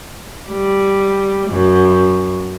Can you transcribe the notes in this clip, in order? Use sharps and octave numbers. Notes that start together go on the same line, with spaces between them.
G3
F#2